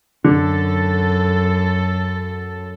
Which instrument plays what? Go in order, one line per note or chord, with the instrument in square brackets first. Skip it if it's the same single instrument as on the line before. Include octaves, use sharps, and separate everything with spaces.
[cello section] F#2 A4 [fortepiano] D3